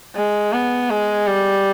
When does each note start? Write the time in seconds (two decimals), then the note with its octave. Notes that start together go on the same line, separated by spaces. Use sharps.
0.15 G#3
0.53 B3
0.90 G#3
1.27 G3